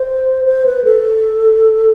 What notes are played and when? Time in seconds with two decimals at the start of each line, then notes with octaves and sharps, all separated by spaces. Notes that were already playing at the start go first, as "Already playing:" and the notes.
Already playing: C5
0.45 C5
0.66 B4
0.84 A4